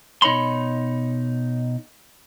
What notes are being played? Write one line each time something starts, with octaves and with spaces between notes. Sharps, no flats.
B2 D#4 C#5 B5 C6